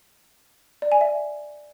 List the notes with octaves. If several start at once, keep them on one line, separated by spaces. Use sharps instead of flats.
D5
G#5
E5